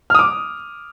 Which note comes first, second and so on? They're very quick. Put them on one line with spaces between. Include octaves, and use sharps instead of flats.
F6 D#6 D6